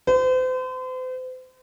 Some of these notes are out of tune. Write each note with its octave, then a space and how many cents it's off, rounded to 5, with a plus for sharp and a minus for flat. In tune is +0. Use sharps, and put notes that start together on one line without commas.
C5 -40